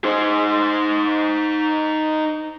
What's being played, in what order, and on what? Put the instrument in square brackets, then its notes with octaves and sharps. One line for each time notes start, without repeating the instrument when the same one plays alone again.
[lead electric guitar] D#4 C5